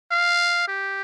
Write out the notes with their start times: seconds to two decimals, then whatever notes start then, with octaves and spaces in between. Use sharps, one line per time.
0.11 F5
0.68 G4